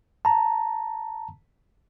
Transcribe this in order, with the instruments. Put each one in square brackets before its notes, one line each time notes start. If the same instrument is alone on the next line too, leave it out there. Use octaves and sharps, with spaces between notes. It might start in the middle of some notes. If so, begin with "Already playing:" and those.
[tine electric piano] A5 A#5